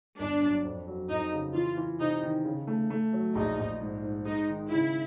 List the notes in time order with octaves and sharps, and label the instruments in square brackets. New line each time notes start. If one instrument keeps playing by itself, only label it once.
[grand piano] G1 [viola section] D4
[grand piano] F#2
F2
F#3
[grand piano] F2 [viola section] D#4
[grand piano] C#3
[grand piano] E3 [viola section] F4
[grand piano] E3
[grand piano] C3 [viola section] D#4
[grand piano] D#3
C#3
A3
A3
F#3
[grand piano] A#1 [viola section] D#4
[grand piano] A#1
G#2
G#2
[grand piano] G#3 [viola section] D#4
[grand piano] D#3
[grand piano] C#3 [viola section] E4